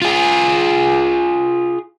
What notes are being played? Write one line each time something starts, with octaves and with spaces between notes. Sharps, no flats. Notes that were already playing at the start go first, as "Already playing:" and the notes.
F4 G#4